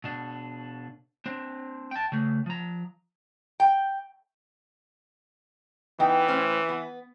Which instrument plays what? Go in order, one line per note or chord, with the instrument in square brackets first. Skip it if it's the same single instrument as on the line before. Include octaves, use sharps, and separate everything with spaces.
[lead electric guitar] B2 D4
C4 D4
G5 A5
C#3 A3
F3 A#5
[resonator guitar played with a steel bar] G5
[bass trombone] E3 [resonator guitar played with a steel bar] B3 D#4 G5
[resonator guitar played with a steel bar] A2 C#4 C5
B3